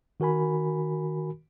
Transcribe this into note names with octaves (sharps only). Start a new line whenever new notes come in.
D#3 F#4 A#4 G#5 B5